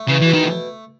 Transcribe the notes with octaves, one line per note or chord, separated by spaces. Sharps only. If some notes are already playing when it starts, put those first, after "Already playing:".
Already playing: A3
E2 C#3
B2 E3
D#3
A3